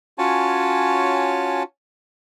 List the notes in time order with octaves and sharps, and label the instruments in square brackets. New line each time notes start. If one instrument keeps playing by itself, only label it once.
[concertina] C#4 F4 F#4 C#5 G#5 A5